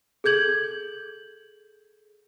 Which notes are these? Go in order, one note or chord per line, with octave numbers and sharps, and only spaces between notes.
G#4 A4 G6 G#6 F#7